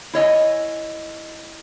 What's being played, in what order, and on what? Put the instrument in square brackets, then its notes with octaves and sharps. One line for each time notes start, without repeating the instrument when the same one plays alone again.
[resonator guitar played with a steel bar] E4 C#5 D#5 G#5